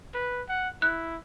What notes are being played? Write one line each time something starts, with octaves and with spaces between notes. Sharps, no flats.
B4
F#5
E4 F#6